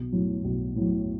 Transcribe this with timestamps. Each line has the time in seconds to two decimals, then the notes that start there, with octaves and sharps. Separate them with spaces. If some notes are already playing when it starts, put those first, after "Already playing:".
Already playing: B1
0.12 A2 F#3
0.44 B1
0.76 A2 F#3